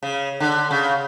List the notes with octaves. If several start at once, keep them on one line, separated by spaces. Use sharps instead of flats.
C#3
D3
C#3